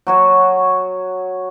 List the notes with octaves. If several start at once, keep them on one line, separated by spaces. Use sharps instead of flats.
F#3 F#4 C#5